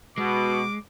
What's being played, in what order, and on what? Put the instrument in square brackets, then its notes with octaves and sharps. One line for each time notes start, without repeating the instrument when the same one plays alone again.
[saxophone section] B2 [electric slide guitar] G#3 [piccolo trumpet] D6